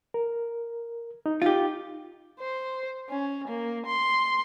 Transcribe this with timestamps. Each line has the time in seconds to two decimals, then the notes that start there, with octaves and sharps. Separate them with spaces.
0.14 A#4
1.26 D#4
1.42 F4 G4
2.40 C5
3.09 C#4
3.48 A#3
3.87 C6